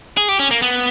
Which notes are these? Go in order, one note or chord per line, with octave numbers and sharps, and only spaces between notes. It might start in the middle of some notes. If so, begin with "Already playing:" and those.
G#4
G4
C#4
A#3
B3